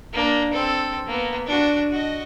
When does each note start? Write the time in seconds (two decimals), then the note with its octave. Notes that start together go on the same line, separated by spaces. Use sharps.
0.13 A#3 D4
0.53 C4 A4
1.07 A#3 B3
1.47 D4 F#4
1.90 F#4 D#5